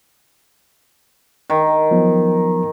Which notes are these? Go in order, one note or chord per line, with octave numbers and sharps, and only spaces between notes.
D#3
F3 F#3 B3